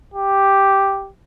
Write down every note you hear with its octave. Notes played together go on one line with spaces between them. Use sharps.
G4